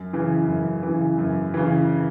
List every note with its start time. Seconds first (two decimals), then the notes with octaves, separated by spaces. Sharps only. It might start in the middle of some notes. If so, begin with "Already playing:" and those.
Already playing: F#2
0.13 C#3 E3
0.48 F#2
0.83 C#3 E3
1.18 F#2
1.54 C#3 E3